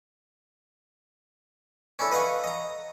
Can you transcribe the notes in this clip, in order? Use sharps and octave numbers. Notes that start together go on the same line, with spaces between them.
C#4 D4 E4 A4
B4 D#5 F5 F#5 C#6
D#5 A#5